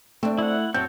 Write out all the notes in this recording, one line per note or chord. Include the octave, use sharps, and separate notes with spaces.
A3 C4 D4
E4 F#5
F#2 C4 F#4 A4 C#5 G6